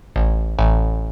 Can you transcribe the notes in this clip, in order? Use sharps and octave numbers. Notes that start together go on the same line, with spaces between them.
A1
A1